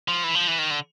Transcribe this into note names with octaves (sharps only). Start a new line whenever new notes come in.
F3
E3
F3
E3
D#3
D3